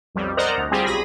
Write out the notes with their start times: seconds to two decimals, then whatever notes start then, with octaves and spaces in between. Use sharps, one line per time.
0.15 B1 F2 G3
0.37 A#4 C5 D5 D#5 F#5 A#5
0.58 D2
0.71 G3 C4 F4 G4 G#4
0.85 B1 G#4 B5 A#6